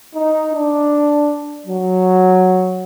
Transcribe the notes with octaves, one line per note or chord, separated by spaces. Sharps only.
D#4
D4
F#3